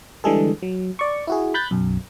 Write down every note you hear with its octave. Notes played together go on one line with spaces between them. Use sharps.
D3 E3 G3 G#3 G#4 A4
F#3
D5 C#6
E4 F#4 G#4
B5 F#6 G6 A6 B6
B1 F#2